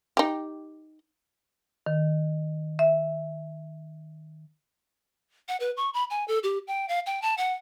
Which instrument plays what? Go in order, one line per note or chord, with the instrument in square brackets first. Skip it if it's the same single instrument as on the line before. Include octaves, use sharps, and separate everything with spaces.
[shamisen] D#4 G4
[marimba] D#3
E5
[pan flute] F#5
B4
C#6
B5
G#5
A4
G4
G5
F5
G5
A5
F#5